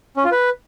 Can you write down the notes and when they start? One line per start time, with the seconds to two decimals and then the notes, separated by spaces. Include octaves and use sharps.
0.17 C#4
0.24 F4
0.32 B4